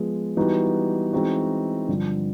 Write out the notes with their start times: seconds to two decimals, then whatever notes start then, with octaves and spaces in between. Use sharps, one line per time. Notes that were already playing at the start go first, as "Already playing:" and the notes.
Already playing: F3 G#3 B3
0.37 E3 G3 B3 D#4 F#4
1.13 E3 G#3 C4 D#4 F#4
1.88 G2 D3 F3